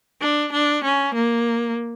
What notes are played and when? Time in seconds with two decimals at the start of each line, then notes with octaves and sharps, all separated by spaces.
0.21 D4
0.52 D4
0.84 C#4
1.14 A#3